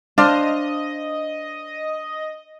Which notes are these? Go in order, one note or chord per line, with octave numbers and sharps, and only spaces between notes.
D4 C5 D#5 F5